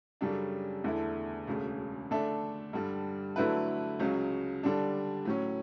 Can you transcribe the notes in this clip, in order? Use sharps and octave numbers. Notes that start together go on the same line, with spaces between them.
F#2 C#3 G3 D4 A4
E2 D3 A3 E4
E1 D2 C#3
D3 A3 D4 A4 E5
G2 D3 G3
D3 F#3 A3 E4 B4
C#2 C#3 F#3
D3 G3 D4
A2 F#3 C#4